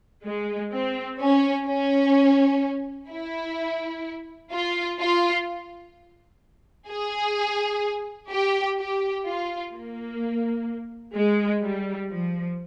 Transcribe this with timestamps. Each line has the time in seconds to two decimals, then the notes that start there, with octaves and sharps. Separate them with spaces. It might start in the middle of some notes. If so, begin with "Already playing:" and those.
0.25 G#3
0.72 C4
1.20 C#4
1.67 C#4
3.10 E4
4.52 F4
4.99 F4
6.89 G#4
8.31 G4
8.78 G4
9.26 F4
9.73 A#3
11.15 G#3
11.63 G3
12.10 F3